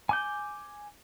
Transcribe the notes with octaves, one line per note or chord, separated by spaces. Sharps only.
G#5 D6 G6